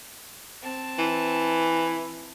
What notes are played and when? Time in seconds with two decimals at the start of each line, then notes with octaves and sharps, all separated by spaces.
0.62 C4 A5
0.99 E3